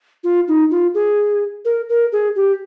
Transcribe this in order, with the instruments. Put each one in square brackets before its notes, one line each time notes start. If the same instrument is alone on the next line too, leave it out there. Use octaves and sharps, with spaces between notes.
[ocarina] F4
D#4
F4
G#4
A#4
A#4
G#4
G4